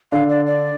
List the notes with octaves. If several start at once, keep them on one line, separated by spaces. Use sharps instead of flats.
D3 D4 F5
D5
D5